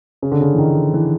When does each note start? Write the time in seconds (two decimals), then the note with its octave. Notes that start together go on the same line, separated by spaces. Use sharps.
0.22 C#3
0.32 D3
0.41 C#3
0.54 E3
0.59 D#3
0.94 E3